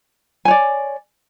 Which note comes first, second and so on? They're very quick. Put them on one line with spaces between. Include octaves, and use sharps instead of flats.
G#5 C#5 D5